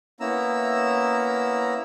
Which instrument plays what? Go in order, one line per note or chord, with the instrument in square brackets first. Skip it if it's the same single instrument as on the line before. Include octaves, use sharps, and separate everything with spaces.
[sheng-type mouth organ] A#3 B3 C#4 E4 A#5 E6